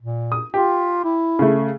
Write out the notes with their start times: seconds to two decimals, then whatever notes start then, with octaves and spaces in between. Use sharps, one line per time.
0.02 A#2
0.32 D#6
0.54 F4 G4
1.04 E4
1.39 C#3 A3